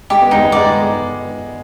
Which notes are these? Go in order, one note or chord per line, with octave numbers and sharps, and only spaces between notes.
G#3 G4
B3
G#3 D#4
B3
G#3 D5